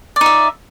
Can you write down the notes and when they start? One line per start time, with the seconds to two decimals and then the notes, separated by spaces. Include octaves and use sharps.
0.16 D5
0.21 D#4
0.26 E5